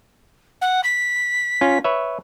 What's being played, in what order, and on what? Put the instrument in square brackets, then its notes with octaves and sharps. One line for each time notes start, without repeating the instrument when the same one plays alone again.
[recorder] F#5
B6
[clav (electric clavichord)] C#4 F4
B4 C#5 E5